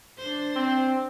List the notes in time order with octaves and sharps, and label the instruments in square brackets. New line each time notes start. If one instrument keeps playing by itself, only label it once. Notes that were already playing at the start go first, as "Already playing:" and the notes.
[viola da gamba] D4 C5
[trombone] C4